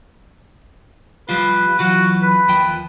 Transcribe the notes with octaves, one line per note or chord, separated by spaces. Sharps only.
F3 G3 F4 B4
E3 F#3 F4 F#4
B4
D#2 F3 G5